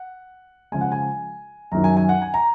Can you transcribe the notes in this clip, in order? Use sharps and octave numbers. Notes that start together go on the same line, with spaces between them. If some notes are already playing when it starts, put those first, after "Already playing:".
Already playing: F#5
C#3 F3 G#3 G#5
F#5
G#5
F#2 D#3 F#3 A#5
G#5
G#5
F#5
G#5
A#5